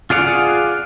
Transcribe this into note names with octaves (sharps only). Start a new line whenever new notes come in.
F4 G#4 D5 F5 F#5